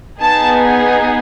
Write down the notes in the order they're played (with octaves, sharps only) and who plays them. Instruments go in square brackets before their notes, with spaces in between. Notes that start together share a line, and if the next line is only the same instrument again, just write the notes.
[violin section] B3 D#4 G#4 A5